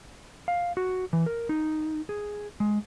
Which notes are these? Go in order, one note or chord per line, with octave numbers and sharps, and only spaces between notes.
F5
F#4
E3
A#4
D#4
G#4
G#3